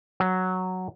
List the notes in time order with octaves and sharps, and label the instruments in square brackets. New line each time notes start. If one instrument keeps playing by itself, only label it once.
[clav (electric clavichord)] F#3